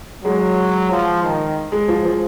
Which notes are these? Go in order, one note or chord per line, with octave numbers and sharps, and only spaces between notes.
F#3 G#3
F3
D#3
G#3
F3
F3